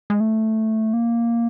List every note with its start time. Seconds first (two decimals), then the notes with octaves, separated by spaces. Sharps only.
0.10 G#3
0.20 A3
0.93 A#3